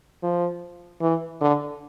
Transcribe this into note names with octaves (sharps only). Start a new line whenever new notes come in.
F3
E3
D3